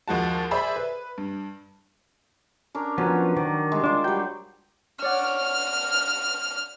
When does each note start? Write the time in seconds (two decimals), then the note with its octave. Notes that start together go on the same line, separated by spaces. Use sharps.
0.08 D#2 F3 G#3 F#4 A5
0.51 G#4 C5 D5 E5 B5
0.76 B4
1.18 G2
2.75 C#4 D4 A#4
2.98 F3 F#3 B3 C#4
3.36 D#3 D5
3.72 G3 G#3
3.83 D4 F4 C5
4.04 F#3 G3 G5
5.02 C#5 D5 F#5 F6